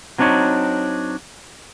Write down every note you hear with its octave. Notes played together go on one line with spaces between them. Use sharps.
F#3 C4 D4 D#4 C#5